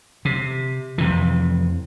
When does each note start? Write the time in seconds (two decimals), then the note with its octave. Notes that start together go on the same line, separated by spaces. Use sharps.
0.25 C3
0.98 F2 C3 E3